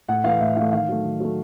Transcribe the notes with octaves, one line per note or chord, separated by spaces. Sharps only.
A2 F#5
E3 A3 F5
A2 E5
E3 A3 F5
D#3 F5
F#3 A3
D#3
F#3 A3